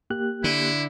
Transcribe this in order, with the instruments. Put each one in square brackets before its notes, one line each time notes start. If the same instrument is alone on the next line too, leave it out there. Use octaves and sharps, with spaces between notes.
[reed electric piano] A#3 G4 F#6
[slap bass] D3 [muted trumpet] E4